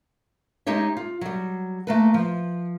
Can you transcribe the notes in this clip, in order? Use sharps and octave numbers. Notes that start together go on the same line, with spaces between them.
G#3 D#4 G4 C#5 E5
F4
F#3 G3
A3 A#3 B4
F3